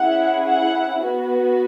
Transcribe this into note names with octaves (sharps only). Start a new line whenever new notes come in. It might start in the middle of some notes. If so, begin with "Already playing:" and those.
Already playing: C#4 E4 G#4 F#5
F#5
B3 F#4